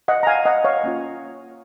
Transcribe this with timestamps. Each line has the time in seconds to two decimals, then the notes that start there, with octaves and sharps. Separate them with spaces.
0.08 D#5 F#5
0.23 A#5
0.27 F5 G#5
0.45 D#5 F#5
0.65 C#5 F5
0.84 A#3 C#4 F4